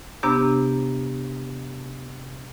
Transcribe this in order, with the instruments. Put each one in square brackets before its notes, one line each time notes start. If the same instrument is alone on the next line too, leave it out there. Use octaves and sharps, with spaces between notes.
[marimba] C3 B3 D4 G4 A#5